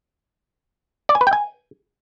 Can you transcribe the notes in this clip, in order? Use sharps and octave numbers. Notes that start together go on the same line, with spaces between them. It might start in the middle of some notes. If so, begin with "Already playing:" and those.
D5
G#5
B4
G5
G#5